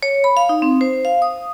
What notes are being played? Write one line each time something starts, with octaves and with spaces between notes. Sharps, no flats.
C#5
B5
F5
D#4
C4
C5
F5
D#6